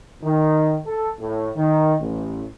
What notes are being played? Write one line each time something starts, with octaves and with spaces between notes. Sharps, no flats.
D#3
A4
A2
D#3
A1